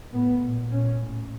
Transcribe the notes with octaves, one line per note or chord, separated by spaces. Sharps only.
A2 B3
A#2
A#2 C#4
A2